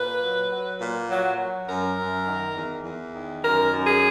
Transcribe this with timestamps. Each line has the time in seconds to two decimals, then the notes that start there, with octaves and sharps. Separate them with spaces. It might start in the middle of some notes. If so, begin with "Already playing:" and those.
Already playing: A#2 B4
0.21 F#3
0.51 F#3
0.80 A#2
1.10 F#3
1.38 F#3
1.68 F#2 A#4
1.97 F#2
2.26 D#3
2.56 E2
2.85 E2
3.14 D#3
3.43 F#2 A#4
3.72 F#2
3.87 G#4